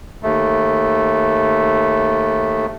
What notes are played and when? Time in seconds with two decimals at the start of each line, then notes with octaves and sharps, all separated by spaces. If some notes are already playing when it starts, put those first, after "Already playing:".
0.23 D#2 A3